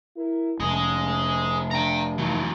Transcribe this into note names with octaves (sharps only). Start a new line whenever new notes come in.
E4 A#4
F1 C#4 G#4 D#5
C3 D4 G5 A#5
E3 F#3 A#3 D#4